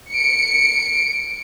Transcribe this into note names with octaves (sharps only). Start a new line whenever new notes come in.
C#7 D7